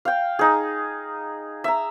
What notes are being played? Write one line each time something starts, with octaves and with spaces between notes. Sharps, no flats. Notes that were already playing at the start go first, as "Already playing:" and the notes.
F5 G5
D#4 G#4
E5 A#5